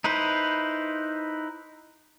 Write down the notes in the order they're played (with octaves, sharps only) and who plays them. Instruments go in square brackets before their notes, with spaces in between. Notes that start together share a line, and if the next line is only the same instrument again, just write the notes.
[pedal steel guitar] D#4 E4 B4 C5